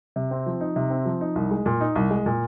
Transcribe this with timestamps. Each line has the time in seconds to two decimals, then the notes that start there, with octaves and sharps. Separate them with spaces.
0.16 C3
0.31 C4
0.46 F3
0.61 D#4
0.76 C3
0.90 C4
1.06 F3
1.21 D#4
1.36 C2
1.51 G#3
1.66 A#2
1.81 D#4
1.95 C2
2.11 G#3
2.26 A#2